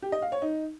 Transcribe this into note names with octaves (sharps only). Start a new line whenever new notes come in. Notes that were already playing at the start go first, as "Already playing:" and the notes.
G4
D#5
F5
C#5
D#4